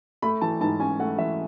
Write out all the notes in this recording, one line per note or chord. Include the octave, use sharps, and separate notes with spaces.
A3 B5
E3 A5
G#2 A5
C#4 G#5
A3 F#5
E3 E5